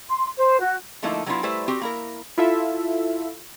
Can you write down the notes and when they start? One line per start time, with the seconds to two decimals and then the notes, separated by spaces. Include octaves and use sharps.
0.09 C6
0.37 C5
0.60 F#4
1.02 D3 F3 A3 A#3 D#4 E4
1.26 F#3 A3 B3 D4 E4 F4
1.43 G3 A3 E4 B4 C5
1.68 C4 F#4 G4
1.81 A#3 E4 A#4
2.38 E4 F4 A4 E5